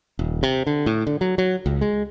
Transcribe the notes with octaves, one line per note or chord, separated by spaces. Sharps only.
D#1
C3
D3
A2
D3
F#3
F#3
C#2
G#3